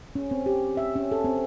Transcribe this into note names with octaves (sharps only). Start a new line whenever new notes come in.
C#4
C4
G4
E5
C#4
A4
C4